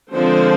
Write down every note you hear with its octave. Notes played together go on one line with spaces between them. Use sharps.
D3 F3 G#3 C4 C5